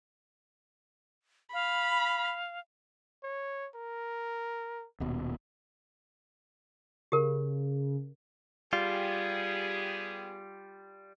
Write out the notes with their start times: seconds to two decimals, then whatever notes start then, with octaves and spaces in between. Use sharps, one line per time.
1.53 F5 B5
3.23 C#5
3.75 A#4
5.00 D#1 B2
7.12 C#3 G4 A#4
8.73 G3 B3 F4 G4 G#4